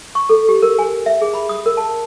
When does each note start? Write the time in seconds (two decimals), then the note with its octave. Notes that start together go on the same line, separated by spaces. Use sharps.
0.15 C#6
0.29 A4
0.49 G4
0.62 A#4
0.79 G#5
1.06 E5
1.22 G#4
1.34 B5
1.49 D#6
1.66 A#4
1.77 A5